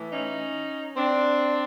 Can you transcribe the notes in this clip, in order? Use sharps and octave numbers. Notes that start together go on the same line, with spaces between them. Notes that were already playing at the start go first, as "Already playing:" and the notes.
Already playing: A2 E3
C#4 D#4
C4 D4